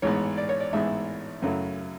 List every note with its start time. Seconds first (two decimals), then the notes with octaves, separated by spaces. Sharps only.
0.02 A1 G#2 G#3 B3 C#5
0.38 D5
0.49 C#5
0.60 D5
0.73 A1 G#2 G#3 B3 E5
1.42 F#2 C#3 F#3 A3 E4